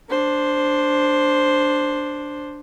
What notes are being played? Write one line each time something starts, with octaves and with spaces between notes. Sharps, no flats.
D4 C5